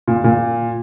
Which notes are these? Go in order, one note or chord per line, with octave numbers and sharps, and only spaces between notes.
A#2
A#2